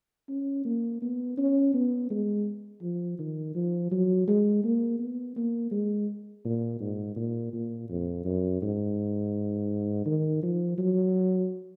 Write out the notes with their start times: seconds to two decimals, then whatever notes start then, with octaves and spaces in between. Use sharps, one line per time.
0.29 C#4
0.65 A#3
1.02 B3
1.38 C#4
1.74 B3
2.10 G#3
2.82 F3
3.19 D#3
3.55 F3
3.92 F#3
4.28 G#3
4.64 A#3
4.99 B3
5.36 A#3
5.71 G#3
6.45 A#2
6.80 G#2
7.16 A#2
7.53 A#2
7.90 F2
8.25 F#2
8.62 G#2
10.06 D#3
10.43 F3
10.78 F#3